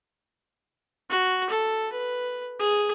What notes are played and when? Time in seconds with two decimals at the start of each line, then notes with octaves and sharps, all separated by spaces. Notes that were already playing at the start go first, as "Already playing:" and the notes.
1.10 F#4
1.50 A4
1.92 B4
2.60 G#4